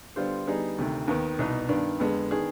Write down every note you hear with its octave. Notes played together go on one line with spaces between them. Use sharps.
D3 G3 B3 F4 C5
D3 G3 B3 D#4 G#4
D2 C3 D#3
D#2 D#3 B3
C2 B2 B3 D#4 B4
G2 D#3 B3 D4
F2 D3 G#3 B3
D#3 B3 D4 G#4